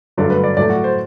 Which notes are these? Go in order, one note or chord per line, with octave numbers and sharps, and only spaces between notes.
G2 D3 F#3 A3 D5
B4
D5
A2 F#3 A3 D5
F#4
C5